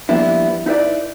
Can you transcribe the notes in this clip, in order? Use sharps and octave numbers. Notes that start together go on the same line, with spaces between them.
F3 G3 A#3 B3 D4 E4
D#4 E4 B4 D5